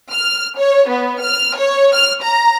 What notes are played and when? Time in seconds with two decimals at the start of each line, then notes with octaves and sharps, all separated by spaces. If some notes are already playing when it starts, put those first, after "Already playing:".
0.11 F6
0.59 C#5
0.89 B3
1.21 F6
1.57 C#5
1.95 F6
2.24 A#5